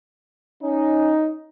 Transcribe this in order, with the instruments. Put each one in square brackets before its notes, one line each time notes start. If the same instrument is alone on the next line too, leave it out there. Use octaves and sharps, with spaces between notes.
[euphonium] C#4 [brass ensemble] D#4